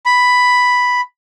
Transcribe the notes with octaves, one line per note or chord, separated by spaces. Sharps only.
B5